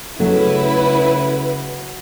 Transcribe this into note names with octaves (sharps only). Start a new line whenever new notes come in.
C#3 F#3 A3 E4 B4